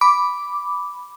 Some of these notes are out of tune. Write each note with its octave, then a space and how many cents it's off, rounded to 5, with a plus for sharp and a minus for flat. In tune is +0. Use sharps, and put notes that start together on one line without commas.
B5 +0 D6 -5